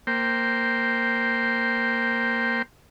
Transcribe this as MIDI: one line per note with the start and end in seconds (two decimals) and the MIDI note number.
0.07 2.62 58
0.07 2.62 72
0.07 2.62 79